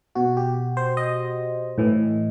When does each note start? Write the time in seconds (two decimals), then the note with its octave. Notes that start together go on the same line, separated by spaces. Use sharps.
0.15 B2 F#4
0.37 G4
0.77 C5
0.97 D#5
1.78 A2 E3